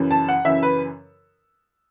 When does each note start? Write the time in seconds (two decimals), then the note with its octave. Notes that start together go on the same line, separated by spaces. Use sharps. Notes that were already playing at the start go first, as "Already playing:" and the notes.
Already playing: F#2 C#3 E3
0.11 A5
0.29 F#5
0.45 F#2 C#3 E3 E5
0.63 B4